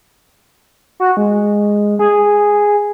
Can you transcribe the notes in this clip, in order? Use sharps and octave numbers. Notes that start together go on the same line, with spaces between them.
F#4
G#3
G#4